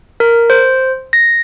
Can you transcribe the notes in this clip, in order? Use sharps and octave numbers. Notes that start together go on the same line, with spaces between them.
A#4
C5
A#6